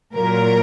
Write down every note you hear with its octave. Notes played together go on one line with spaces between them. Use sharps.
A#2 F#3 A#4